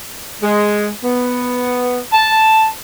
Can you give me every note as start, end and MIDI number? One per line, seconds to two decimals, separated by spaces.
0.42 0.88 56
1.03 1.98 59
2.12 2.65 81